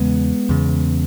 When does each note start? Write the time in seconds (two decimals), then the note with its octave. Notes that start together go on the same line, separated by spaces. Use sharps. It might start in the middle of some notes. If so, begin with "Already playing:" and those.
Already playing: E2 C#3 G#3 B3
0.49 E2 C#3